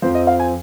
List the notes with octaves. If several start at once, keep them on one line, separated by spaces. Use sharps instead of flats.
F2 F3 C4 C5
D#5
F5
G#5